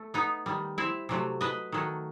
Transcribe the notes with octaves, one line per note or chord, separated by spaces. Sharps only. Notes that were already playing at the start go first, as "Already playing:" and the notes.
Already playing: A3
B3 D#4
D#3 G3
C4 E4
C3 F#3 A3
B4 D#5
D#3 F#3 A3